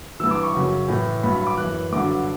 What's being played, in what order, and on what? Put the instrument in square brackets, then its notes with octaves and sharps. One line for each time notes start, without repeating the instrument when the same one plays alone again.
[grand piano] E3 E6
G2
D6
C#6
F#2 C#3 F#3
A2 E3
G2 F#3 B5
B5
D6
F#2 E3 F#6
G2 D3 F#3 D6